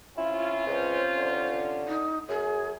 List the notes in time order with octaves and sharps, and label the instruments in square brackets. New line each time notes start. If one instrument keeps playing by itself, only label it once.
[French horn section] C3 C#4 F4 [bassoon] E4
[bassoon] C#2 [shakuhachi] C5
[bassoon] D3
[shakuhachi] D#4
[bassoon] F#2 [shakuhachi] G#4